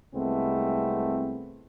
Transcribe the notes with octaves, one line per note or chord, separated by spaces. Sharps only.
C2 G#3 A3 B3 C4